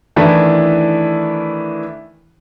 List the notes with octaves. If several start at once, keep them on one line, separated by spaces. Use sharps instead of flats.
D#3 E3 A3 D4 E4